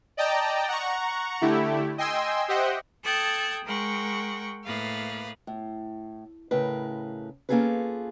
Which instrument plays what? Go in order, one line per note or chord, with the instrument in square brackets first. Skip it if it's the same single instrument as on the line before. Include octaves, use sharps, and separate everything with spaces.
[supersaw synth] D5 D#5 G5 A5 A#5
F#5 A#5 C#6
D3 A3 E4 G4
D#5 G5 G#5 C6 E6
G4 C5 D#5 E5 F#5 G5
[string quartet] A4 G5 A5 D#6 F#6 G#6
G#3 A#4 F#5 G5 C#6
A2 A#3 B4 F5 D#6
[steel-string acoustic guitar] A2
A2 C#3 A#4 B4
A#3 C#4 F4 G#4 A4 B4